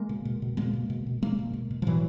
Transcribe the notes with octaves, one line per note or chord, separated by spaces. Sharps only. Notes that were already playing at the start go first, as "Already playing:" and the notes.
Already playing: G#3 A#3
B2
B2
B2
B2 G#3 A#3
B2
B2
B2
B2 G#3 A#3
B2
B2
B2
F3
A2 E3 F#3